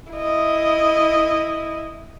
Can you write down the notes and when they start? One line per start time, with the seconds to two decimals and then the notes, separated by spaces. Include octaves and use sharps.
0.12 E4 D#5